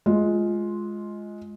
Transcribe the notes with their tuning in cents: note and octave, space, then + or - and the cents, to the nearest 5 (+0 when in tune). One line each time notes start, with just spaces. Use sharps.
G#3 +10 F4 +0